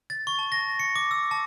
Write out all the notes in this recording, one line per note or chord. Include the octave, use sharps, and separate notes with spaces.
A6
C#6
A5
A#6
C#7
D6
E6
A5